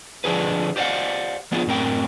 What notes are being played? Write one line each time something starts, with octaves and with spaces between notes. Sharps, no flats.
D3 F3 D4 G#4 B4
G4 C5 D5 F5 F#5
F3 B3 D4 F4 G#4
F#2 A2 C4 A#4 G5